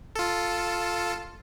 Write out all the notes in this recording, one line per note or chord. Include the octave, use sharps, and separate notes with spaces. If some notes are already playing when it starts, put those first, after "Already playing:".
F4 A4